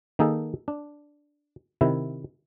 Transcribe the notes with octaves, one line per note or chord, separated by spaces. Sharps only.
D#3 A#3 D#4 G#4 A4
D4
C3 D#3 E4